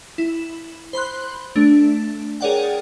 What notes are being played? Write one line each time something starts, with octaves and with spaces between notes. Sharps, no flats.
E4
C5 B5 C6 F#6
A3 D4
G#4 A#4 C#5 D5 F#5 G5